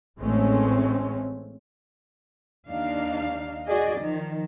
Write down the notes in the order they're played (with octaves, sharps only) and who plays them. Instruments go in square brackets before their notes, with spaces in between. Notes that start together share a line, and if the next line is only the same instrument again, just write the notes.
[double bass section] A1 G#3 A3 C4 C#4
[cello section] D#2 D4 D#4 F5
F#4 G#4 D5 D#5
D#3 F3